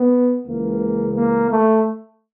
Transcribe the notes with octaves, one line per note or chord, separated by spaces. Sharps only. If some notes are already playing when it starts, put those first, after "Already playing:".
Already playing: B3
C#2 C#3 E3 A#3
A#3
A3